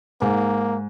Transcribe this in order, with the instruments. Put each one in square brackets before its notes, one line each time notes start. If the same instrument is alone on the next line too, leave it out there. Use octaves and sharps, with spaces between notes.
[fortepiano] G#2 [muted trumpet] A#3